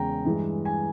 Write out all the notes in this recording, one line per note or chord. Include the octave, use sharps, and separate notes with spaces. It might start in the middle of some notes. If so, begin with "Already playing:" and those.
Already playing: E2 C#3 G#3 G5 A#5
G2 E3 G#3
G#5